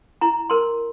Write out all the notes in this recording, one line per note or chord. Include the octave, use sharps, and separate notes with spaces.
E4 A#5
A#4 C6